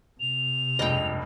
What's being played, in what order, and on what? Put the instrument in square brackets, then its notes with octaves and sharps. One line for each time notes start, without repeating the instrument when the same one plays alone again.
[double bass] C3 [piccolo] F7
[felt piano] F1 C#2 G2 [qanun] D#5 G5